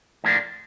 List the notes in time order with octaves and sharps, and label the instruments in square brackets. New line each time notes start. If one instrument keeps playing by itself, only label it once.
[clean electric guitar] A2 F3 A#3 D4